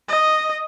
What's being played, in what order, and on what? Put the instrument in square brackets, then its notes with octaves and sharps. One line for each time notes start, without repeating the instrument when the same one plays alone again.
[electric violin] D#5